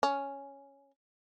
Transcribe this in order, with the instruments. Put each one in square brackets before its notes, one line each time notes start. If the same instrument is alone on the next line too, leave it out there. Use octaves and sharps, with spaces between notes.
[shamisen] C#4